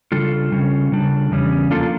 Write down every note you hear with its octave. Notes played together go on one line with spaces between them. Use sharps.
C#3 G3 D4 F4 A4
C#3 G3 C#4
C#3 G3 D4
E2 C#3 G3 C#4
F3 A#3 D4 F4 A4